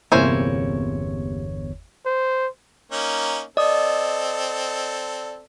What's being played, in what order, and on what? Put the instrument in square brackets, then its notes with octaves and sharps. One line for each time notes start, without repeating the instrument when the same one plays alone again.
[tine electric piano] G1 E2 C#5 [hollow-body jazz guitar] C3 A#3 [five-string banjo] C#4 E4 C5
[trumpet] C5
[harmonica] A#3 C#4 D#4
[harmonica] C4 A4 [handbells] D5 [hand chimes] D#5 D#6